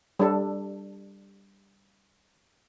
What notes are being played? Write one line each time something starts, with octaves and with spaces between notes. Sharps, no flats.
G3 D4 A4